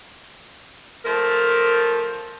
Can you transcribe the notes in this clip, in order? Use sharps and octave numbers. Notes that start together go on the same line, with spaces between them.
F3 A3 A#4